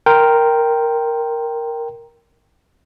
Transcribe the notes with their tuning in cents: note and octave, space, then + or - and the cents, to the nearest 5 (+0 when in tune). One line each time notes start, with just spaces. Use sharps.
A#4 +0 G5 +0 C6 +0